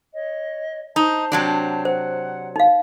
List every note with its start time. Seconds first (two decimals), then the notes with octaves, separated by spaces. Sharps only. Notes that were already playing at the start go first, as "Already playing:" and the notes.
0.13 C#5 D#5
0.96 D#4 C5 A5
1.32 C3 F#3 D4
1.85 C5 F#5
2.56 D#4 F5